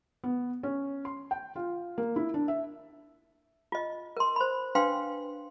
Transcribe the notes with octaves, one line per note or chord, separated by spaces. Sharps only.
B3
C#4
C6
G5
F4
A#3
E4
D4
E5
F4 D#5
A#4 C6
C5 B5
D4 B4 F5 G5 C6